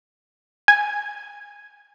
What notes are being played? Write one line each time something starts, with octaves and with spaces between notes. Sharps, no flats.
G#5